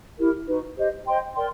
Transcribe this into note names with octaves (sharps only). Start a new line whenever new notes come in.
E4 G4 A#4
D#4 F#4 B4
G4 C5 D#5
C5 D#5 G5 C6
A#4 D5 G5 C6